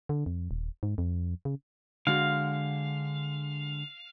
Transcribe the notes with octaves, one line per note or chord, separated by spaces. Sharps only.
D3
F2
D#1
G#2
F2
C#3
D3 G#3 F#4 F5